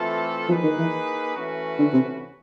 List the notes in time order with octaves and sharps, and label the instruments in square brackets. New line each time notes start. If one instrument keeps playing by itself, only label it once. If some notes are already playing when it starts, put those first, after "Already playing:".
Already playing: [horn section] E3 A3 C4 F4 A4
[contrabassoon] F3 [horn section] A#3 D#4 G#4 B4
[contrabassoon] D#3
E3
[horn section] E3 A3 C#4 F#4 B4
[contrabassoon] D3
C3